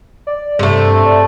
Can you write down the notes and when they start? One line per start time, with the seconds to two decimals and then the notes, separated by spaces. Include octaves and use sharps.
0.27 D5
0.59 G2 C3 A3
1.05 D5